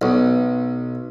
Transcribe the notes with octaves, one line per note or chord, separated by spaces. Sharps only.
B1